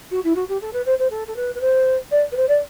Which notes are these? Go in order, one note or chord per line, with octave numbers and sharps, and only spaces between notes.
F#4
E4
F#4
G4
A4
B4
C5
C5
A4
A4
B4
B4
C5
D5
B4
C5
D5